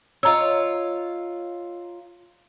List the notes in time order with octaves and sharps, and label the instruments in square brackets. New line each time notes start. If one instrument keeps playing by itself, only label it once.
[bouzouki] F4 C#5 [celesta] D#5 A#5 E6